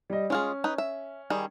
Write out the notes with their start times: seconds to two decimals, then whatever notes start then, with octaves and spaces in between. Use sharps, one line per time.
0.10 G3 D#5
0.30 G#3 C#4 F4 G#4
0.64 D#4 B4
0.78 E5
1.30 D#3 G3 G#4